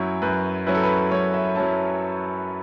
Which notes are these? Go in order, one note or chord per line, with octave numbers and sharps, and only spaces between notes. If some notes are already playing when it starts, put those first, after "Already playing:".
Already playing: F#2 F#3 C#4 E4 C#5
F#2 B4
F#3 C#4 E4 B4
A4
B4
F#2 C#5
E5
F#3 C#4 E4 A5